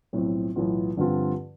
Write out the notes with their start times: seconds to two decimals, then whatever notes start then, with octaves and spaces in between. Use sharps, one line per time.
0.13 B1 A2 F3 C4
0.55 B1 A2 E3 B3 F4
0.97 G2 D3 F3 C4 F4